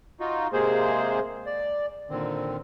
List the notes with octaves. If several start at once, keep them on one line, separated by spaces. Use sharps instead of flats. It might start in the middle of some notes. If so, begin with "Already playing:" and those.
D#4 F4 F#4
C3 G#3 A#3 G#4 C5
D5
A#2 D3 D#3 C4